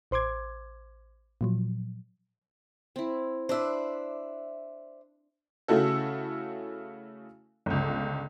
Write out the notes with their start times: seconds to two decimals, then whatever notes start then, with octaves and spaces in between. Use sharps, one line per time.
0.11 A1 C5 C6 D6 G#6
1.41 A#2 F3 F#3
2.96 C4 E4
3.49 D4 B4 C5 D5 E5
5.68 C#3 A3 E4 F#4 A4
7.66 G1 C#2